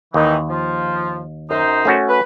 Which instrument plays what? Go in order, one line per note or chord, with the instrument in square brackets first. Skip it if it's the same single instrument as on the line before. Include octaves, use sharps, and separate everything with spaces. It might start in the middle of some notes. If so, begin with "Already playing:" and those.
[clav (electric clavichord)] D#2 [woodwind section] D#3 E3 D#4
[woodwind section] F3
F#2 D#4 C5
[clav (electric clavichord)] A3 C#4 F#4
[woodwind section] B4